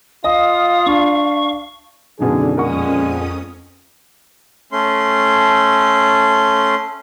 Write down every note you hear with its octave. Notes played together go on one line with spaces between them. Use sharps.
F4 D#5 F5 D#6
D4 C#6
F#2 B2 D3 D#3 G#4
F2 A#2 G#3 C#4 A#4 F#5 C#6 D#6
A3 C#4 C6